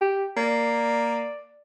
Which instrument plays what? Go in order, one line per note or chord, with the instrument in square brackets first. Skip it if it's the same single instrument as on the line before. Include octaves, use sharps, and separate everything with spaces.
[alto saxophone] G4
[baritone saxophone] A#3 [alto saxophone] D5